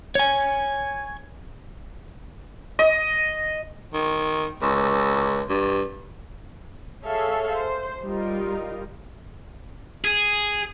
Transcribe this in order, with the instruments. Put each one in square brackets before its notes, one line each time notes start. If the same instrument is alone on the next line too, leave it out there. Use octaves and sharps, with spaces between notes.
[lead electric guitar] C#5 G#5
[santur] D#5
[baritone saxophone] D#3
C#2
G2
[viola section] G#4 A4 C#5 E5 F5
C5
G3 D#4 F4 A#4
[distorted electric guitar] G#4